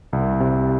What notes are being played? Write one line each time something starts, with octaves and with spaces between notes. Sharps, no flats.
C2
C3